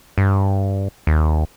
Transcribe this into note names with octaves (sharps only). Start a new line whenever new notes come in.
G2
D#2